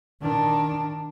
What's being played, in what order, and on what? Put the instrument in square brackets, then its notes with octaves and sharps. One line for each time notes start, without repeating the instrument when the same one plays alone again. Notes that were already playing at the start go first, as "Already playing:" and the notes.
[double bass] D#3 D4